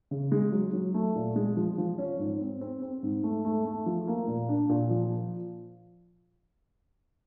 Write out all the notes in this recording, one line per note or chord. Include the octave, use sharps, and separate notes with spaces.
C#3
G#3
F#3
F#3
A3
A#2
G#3
F3
F3
C#4
G#2
C4
C4
C4
G#2
A3
A3
A3
F3
A#3
A#2
D4
A#2
F3